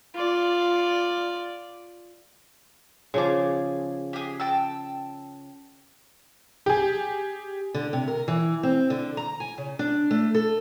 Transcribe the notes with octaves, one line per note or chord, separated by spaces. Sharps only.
F4 D5
C#3 F3 G#4 D6
G4 G#4
G5 A5 E6
G4 G#4
D3
C3
A#4
E3
C4
D3
A#5
G#5
C#3
D4
A3
A4